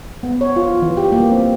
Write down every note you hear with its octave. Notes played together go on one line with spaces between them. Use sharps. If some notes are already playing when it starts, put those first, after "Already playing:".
B3
C#5
F4
E3
G4
A#3
C4